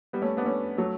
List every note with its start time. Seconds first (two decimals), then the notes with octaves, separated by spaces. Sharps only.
0.13 G3 B3
0.22 A3 C#4
0.37 B3 D4
0.45 A3 C#4
0.78 F#3 A3